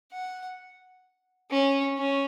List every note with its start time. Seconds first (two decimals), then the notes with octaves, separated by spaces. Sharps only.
0.12 F#5
1.51 C#4
1.97 C#4